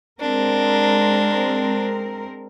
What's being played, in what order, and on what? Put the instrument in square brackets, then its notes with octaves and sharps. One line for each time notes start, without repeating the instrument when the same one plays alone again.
[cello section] G#3 C4 A#4 [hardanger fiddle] D4